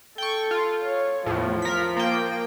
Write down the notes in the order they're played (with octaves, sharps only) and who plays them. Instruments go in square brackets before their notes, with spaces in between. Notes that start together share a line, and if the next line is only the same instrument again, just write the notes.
[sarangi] A4 [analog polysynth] G5 C#6
[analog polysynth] F4
[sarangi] C#5
[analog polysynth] E2 A2 [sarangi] F3
[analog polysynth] A#4 B6
A#3 G5